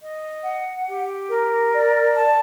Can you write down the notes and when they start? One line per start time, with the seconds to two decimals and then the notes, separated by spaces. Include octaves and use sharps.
0.02 D#5
0.44 F#5
0.87 G4
1.30 A#4
1.73 D5
2.15 A5